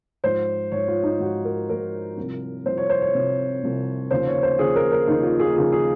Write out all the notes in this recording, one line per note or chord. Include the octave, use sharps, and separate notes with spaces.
G#2 F3 C5
G#2 F3 C#5
F4
D#4
G#2 F3 F#4
A#4
G#2 F3 A#4
C2 C3 F3
C2 C3 F3 C5
C#5
C5
C#5
C2 C3 F3
C2 C3 F3
D#2 C#3 F3 C5
C#5
C5
D#2 C#3 F3 G#4
A#4
A#4
D#2 C#3 F3 D#4
F4
G#4
D#2 C#3 F3 G#4
G#4